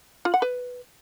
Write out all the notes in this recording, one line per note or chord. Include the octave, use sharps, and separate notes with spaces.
F4
F#5
B4